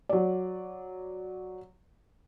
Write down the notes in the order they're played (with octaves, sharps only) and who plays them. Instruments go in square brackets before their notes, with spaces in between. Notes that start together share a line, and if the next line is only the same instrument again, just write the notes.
[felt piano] F#3 D5